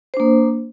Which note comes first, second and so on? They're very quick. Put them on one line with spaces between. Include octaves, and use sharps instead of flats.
C5 D4 A#3